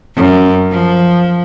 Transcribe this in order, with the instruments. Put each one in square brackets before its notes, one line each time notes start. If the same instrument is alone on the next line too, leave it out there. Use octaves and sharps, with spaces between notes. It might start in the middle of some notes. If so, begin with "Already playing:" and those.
[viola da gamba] F#2
F3